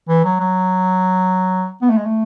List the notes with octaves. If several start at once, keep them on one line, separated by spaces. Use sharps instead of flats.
E3
F#3
F#3
B3
A3
G#3
A3